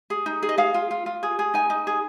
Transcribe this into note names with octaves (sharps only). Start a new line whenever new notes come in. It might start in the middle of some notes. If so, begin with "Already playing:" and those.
G#4
D#4
G#4
D#5
G#4 F5
F4
F4
F4
G#4
G#4
D#4 G#5
D#4
G#4